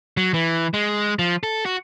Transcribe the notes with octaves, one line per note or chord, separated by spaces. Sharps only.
F#3
E3
G#3
F3
A4
F#4